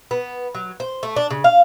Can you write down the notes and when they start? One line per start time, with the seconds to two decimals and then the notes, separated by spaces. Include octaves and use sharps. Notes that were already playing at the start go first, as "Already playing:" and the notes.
0.11 B3
0.55 F#3
0.80 C5
1.03 A3
1.16 D4
1.30 C#3
1.44 F5